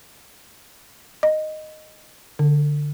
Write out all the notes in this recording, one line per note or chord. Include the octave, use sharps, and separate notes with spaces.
D#5
D3